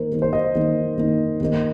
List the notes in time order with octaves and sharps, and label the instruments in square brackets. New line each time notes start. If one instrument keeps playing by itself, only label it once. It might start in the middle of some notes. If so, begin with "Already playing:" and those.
Already playing: [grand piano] D#3 A#3 D#4 A#4 C5
D#3 A#3 D#4
C5
D#5
D#3 A#3 D#4
D#3 A#3 D#4
D#3 A#3 D#4